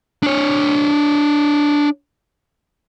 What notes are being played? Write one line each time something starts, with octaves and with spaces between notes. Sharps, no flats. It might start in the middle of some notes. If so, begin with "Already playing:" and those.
D4 C#5